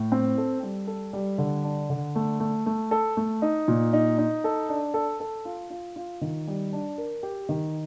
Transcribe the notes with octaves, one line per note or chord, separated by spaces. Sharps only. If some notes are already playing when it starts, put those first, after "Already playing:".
Already playing: A2
C4
A4
G3
A4
G3
D3
D4
D3
A3
A3
A3
A4
A3
D#4
A#2
D#4
D#4
A4
D4
A4
A4
F4
F4
F4
D#3
G3
D4
A#4
G4
D#3